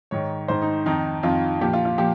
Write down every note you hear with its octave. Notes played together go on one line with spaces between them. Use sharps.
G#2 D#3 C#5
G#2 D#3 C5
D#4
F2 D#3 D#4
F2 D#3 F4
A#2 F3 G4
F4
F4
A#2 F3 G4